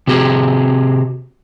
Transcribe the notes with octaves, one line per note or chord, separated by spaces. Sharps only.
C3 C4 F#4 G#4